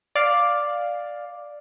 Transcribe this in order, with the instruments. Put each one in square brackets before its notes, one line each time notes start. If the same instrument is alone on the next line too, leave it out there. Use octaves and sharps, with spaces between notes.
[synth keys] D5 F5